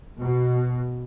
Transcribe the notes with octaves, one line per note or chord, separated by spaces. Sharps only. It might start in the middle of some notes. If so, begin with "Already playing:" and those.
B2